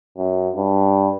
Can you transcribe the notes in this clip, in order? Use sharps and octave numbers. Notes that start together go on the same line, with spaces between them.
F#2
G2